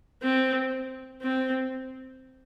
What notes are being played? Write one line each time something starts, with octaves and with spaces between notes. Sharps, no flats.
C4
C4